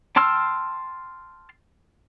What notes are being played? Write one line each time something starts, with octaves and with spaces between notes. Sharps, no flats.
G5 A5 C6 E6 F6